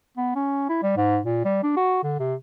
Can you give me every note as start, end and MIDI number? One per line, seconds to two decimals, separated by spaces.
0.17 0.34 59
0.35 0.68 61
0.69 0.80 64
0.83 0.96 55
0.97 1.19 44
1.25 1.41 46
1.45 1.61 55
1.63 1.75 62
1.77 1.99 66
2.03 2.19 50
2.20 2.34 48